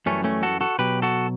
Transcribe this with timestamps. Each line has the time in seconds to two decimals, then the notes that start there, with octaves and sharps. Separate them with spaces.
0.06 F#2 E3 G3 A3 C#4
0.24 A3 C#4
0.43 F#4 A4
0.61 F#4 A4
0.79 B2 F#3 G4 B4
1.02 F#4 A4